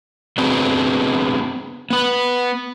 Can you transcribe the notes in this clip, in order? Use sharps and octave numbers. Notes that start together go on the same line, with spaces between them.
B3 C4 D4 F#4 G#4 B4
B3 B4